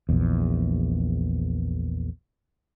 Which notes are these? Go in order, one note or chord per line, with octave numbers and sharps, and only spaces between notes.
A#1 E2